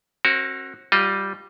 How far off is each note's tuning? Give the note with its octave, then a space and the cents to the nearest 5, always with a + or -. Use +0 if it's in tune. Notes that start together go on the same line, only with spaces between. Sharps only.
C4 +45 F#4 +0 A#4 +0
G3 -5 F4 +20 D#5 +0